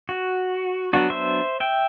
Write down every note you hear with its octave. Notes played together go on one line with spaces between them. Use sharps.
F#4
F#3 B3 D4 F#4
C5 E5
E5 G5